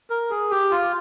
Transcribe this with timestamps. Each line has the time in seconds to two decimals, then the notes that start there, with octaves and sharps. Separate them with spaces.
0.10 A#4
0.30 G#4
0.51 G4
0.71 F4